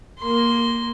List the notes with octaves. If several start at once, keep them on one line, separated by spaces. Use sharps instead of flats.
A#3 C6